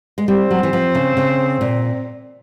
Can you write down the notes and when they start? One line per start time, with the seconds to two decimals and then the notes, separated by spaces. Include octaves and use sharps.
0.18 G#3
0.28 G3 C4
0.51 F#3
0.63 E3
0.73 F3
0.95 C#3
1.17 C#3
1.61 A#2